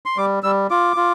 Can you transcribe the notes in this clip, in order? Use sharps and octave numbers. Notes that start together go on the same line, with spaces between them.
C6
G3 D6
G3 E6
F4 D6
F4